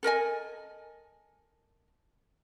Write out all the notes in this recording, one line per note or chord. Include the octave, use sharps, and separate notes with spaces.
A4 A#4 D#5 G#5